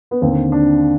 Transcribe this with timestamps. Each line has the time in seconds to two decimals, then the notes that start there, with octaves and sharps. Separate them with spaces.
0.11 B3
0.21 D#2 D3 C4
0.52 D4